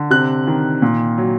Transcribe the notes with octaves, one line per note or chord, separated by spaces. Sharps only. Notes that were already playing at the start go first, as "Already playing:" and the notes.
Already playing: D3
C3 F#6
D#3
A#2
F#3